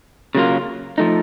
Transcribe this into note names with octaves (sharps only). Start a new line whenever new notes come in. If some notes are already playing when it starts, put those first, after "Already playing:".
C#3 F#3 A#3 F4
F3 A3 D#4